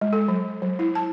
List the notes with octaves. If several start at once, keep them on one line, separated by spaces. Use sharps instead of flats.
G#3
A4
F#3
F#3
E4
A5